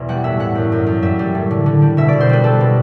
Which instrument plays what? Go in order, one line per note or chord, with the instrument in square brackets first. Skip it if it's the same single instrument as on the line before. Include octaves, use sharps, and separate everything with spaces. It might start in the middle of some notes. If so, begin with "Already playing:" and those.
Already playing: [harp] E2 B2 D5
G3 F#5
A2 E5
A2 F#5
F#2
F#2
F#2
G3 E5
G3
A2
D3
D3
G3
B2 E5
B2 D5
C5
G3 B4
G3 A4
B2